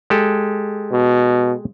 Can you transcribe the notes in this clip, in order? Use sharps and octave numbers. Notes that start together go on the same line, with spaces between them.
G#3 G4 A4
B2